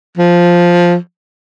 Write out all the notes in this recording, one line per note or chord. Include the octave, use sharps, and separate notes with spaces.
F3